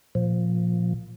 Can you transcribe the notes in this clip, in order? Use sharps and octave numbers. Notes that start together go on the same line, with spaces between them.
A#2 F3